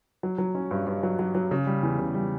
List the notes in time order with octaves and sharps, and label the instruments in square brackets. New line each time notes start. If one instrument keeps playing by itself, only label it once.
[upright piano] F#3
F#3
C#4
G2
G2
F#3
F#3
F#3
C#3
G3
E2
C#3
G3